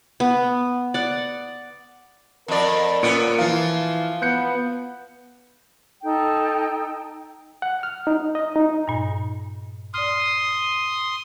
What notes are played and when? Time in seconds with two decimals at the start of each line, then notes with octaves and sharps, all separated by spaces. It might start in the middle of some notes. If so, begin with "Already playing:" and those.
0.20 B3
0.94 D5 F#5
2.48 F2 A#4 D5
3.03 A#2 B3 C#4 C#7 D7
3.39 E3 F3 F4 F5
4.22 B3 F#6 G6 C#7
6.02 D#4 A4 G5
7.62 F#5
7.83 F6
8.07 D#4
8.35 D#5
8.56 D#4
8.88 G2 A#2
9.94 D5 C6 D#6 F6